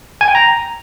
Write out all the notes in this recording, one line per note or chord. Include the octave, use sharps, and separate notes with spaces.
G#5
G5
A#5